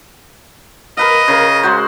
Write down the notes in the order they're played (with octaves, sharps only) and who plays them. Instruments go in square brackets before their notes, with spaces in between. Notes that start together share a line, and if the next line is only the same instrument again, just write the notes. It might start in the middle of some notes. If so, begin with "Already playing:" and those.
[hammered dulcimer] A#4 B4 F5 [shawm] D#5
[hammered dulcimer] C#3 A#4
G#3 F#4 C5